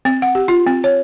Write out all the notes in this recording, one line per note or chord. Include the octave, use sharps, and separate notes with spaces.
C4
F#5
G4
F4
C4
C#5